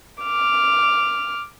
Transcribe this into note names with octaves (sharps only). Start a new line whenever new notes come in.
D6 F6